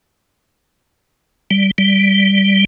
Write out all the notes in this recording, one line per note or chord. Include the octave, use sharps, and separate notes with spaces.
G3
G3